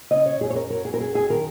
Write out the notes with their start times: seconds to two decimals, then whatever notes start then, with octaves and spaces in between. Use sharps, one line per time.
0.11 C#3 D#5
0.26 C#5
0.41 F#2 G#4
0.50 C#5
0.55 A#4
0.70 F#3 A#4
0.85 G#4
0.94 A#4
1.00 F#2 G#4
1.15 G#4
1.30 D#3 A#4